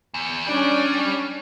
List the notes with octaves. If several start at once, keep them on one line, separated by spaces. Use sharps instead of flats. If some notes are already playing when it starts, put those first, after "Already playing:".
E2
G3 C#4 D4 D5